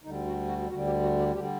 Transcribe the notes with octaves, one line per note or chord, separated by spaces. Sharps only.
D2 D3 G3 D#4
F#4
F#4
D2 D3 G3 F#4
G4
F#4
G4
D3 G3 G4